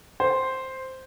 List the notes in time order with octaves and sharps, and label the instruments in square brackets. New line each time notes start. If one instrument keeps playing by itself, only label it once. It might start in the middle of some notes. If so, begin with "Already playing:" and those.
[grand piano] C5